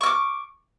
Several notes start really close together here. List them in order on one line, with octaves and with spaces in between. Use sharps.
C#6 F6 D6